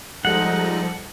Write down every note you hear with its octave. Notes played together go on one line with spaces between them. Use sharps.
F3 G3 G#3 D#4 A4 D#5 F#5